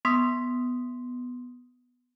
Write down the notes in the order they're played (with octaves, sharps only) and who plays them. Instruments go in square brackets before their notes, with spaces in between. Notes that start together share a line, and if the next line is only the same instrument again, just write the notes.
[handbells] B3 C6 D#6 B6